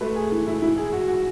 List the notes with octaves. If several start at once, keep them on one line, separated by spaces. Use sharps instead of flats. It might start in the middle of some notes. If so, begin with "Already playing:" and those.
A3 B4
G#4
E3
E4
E3 E4
G#4
E3 F#4
F#4